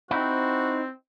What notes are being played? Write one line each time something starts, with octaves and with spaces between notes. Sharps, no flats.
C4 D#4 E4 F#4